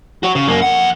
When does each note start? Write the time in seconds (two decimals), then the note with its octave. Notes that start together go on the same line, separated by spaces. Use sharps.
0.23 F#4 C#5
0.35 C#3
0.48 F#2 A#3
0.62 F2 F#5